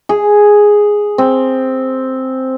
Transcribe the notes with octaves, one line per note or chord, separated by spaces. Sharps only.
G#4
C4